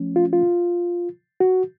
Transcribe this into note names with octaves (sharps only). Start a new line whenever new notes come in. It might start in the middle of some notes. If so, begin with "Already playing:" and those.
Already playing: F3 A3 C#4
F4
F4
F#4